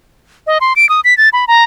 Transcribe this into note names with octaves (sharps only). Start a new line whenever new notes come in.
D#5
C6
D7
D#6
B6
A6
B5
A#5